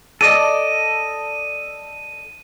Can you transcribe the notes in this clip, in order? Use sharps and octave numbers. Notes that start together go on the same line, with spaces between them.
A4 D5 D#5 D#7